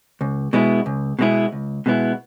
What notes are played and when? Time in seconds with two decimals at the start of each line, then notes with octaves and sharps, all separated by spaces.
0.21 C#2
0.53 B2 G#3 B3 E4
0.86 C#2
1.19 B2 G#3 B3 E4
1.52 C#2
1.86 B2 G#3 B3 E4